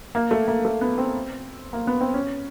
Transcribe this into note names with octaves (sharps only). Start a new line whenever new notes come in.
A#3
A3
A#3
A3
B3
C4
A#3
B3
C4
C#4